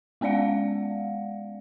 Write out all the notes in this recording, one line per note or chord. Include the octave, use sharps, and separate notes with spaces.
G#3 B3 C#4 D5 F5 F#5